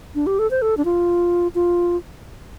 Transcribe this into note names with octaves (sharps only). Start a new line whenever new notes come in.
D4
G4
A4
C5
A4
D4
F4
F4